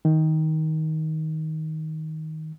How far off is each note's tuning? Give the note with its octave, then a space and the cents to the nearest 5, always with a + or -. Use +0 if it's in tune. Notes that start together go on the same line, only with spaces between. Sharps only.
D#3 +15